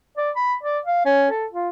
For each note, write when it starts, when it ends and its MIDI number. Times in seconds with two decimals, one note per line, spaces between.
0.17 0.31 74
0.36 0.55 83
0.63 0.79 74
0.85 1.05 77
1.05 1.30 61
1.31 1.46 69
1.52 1.70 65